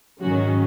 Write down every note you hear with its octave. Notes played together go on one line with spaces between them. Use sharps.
G#2 D#3 F#3 C#4 F#4